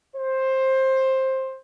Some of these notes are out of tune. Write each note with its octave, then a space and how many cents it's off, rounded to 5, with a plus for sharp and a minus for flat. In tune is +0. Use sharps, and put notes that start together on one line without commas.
C5 +15